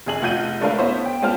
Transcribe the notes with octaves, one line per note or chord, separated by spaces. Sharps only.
F1 A3 G#4 G#5 F#7
F1 F4 F#5 G6 D#7
G#3 A3 D4 A#4 B4 F5
B3 E4 C5 C#5
G5
G#3 B3 F4 C5 A5 F6